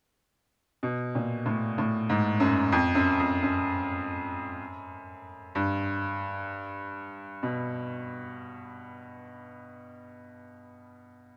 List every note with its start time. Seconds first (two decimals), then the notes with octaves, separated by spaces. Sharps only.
0.83 B2
1.15 A#2
1.46 A2
1.78 A2
2.09 G#2
2.40 F#2
2.72 F2
2.95 F#2
3.20 F2
3.43 F#2
5.55 G2
7.43 B2